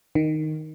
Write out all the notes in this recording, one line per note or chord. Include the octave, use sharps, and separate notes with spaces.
D#3